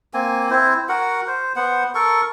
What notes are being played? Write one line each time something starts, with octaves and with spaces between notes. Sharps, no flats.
A#3 C4 G#5
C4 E4 C5
F#4 A#4 F#5
C5
B3 C5 F#5
A4 A#4 C#6